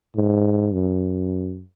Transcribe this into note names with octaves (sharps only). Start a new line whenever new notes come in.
G#2
F#2